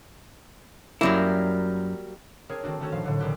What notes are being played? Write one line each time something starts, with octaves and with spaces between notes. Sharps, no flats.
F#2 F#3 G3 A#3 E4
C4 D4 G#4 A#4 C#5
D#3 A3 C4 D4 F#4
D#3 A3 C#4 F#4 A4 C#5
G#1 A#2 F3 G3 F5
A2 D3 F#3
E1 A#1 D#3 C4 G4 F#6